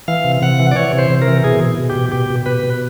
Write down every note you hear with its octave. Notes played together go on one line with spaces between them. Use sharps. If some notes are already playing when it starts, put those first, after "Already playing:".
E3 F5
C3
C3 F#5
E3
D5
E3 C#5
C3
C5
C3
A#4
E3
B2 G#4
B2
B2
G4
B2
B2 G4
B2
B2 B4
B2